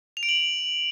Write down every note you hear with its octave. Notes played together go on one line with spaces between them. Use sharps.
F7
D7
F#7